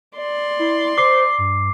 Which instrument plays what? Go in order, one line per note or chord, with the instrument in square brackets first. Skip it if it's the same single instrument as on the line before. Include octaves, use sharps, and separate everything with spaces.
[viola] D5 C6
[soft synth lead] E4
[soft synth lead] C5 [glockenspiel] D6 C7
[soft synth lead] G2